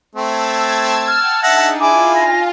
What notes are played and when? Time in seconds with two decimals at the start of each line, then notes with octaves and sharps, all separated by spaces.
0.16 A3 C4 A5 E6 G#6
1.08 F#5 G5 A5 F6
1.43 D4 D#4 G#4 E5 F#5 A5 A#6
1.80 E4 F4 G#5 D6
2.16 A#6